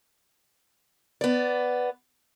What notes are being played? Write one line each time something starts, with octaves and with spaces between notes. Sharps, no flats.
B3 D5